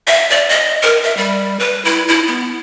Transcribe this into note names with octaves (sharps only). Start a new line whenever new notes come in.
E5
D5
D#5
A#4
E5
G3
B4
E4
E4
B3